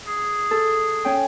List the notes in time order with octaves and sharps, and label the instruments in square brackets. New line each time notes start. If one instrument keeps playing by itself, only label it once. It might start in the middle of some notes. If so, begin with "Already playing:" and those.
[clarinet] G#4
[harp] A4
C#4 G5